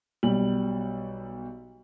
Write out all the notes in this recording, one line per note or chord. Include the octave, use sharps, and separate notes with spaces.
B1 G3 F#7